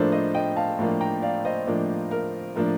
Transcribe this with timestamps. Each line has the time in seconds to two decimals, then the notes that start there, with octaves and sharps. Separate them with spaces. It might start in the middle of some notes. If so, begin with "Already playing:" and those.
Already playing: A2 F3 A#3 D4 A4 C5
0.12 C5 D#5
0.35 D#5 G5
0.56 F5 A5
0.79 A2 F3 A#3 D4
1.01 G5 A#5
1.22 D5 F5
1.45 C5 D#5
1.67 A2 F3 A#3 D4
2.11 A#4
2.55 A2 F3 A#3 D4 A#4